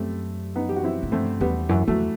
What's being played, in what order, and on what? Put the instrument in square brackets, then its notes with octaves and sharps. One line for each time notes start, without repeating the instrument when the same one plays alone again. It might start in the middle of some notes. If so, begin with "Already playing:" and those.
Already playing: [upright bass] F#2 [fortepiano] G3 A3 C4
[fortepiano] B3 D#4
G4
F#4
C4 E4
[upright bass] A2
[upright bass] G2 [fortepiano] A3 C4
[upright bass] E2 [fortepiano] G3 B3
[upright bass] F#2 [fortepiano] E3
[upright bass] E2 [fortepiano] F#3 A3